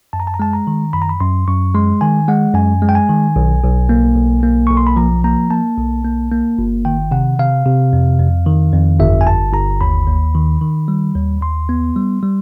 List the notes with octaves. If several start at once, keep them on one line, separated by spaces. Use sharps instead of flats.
F#2 A5
A#5
A5
A#5
G#3 A5
A#5
D#3
F#2 B5
A#5
B5
F#2 C6
F#2 C#6
G#3 C6
D#3 G#5
G#3 F#5
F#2 G#5
G#3
G5
G#5
D#3
B1
B1
A#3
B1
A#3
B1 C#6
C6
B5
F3 A#5
A#3 A#5
A#3 A5
B1
A#3
A#3
G1
D#3 G5
C3 F#5
C3 F5
C3
F2
F2
D#3
F2
G1 E5
G#5
G1 A5
G1 A#5
D#2 B5
D#2
D#3
D#3
G3
D#2
D#2 C6
B3
G3
G3